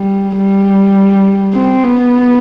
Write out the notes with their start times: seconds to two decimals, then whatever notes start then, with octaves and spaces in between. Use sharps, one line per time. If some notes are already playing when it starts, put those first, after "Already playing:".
Already playing: G3
0.38 G3
1.53 C4
1.83 B3